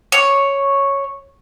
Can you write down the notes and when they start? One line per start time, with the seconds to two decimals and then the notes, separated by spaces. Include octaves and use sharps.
0.12 C#5